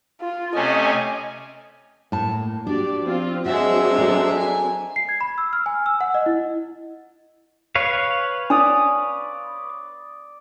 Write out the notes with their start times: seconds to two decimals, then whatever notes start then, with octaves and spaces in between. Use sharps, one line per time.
0.21 F4
0.55 C3 A3 C#4 D#5 G#5
2.12 A2 A#3 A5
2.67 D4 F#4 G4 D5
3.01 F3 C4 F4
3.46 F#3 G#3 C4 D4 F#4 E5
3.98 A4 A#4
4.37 G#5
4.96 C7
5.09 G#6
5.21 B5
5.38 E6
5.53 F6
5.66 G#5
5.86 E6
6.01 F#5
6.15 D#5
6.26 E4
7.75 B4 C#5 F5
8.50 D4 D5 D#6